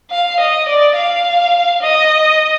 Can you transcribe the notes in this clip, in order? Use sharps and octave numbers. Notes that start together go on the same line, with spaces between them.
F5
D#5
D5
F5
D#5